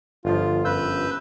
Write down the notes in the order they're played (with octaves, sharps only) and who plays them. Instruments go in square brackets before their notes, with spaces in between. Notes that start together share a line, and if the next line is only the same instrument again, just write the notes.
[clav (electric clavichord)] G1 F3 [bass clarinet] F4
[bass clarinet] F#2 [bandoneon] B4 E6 G6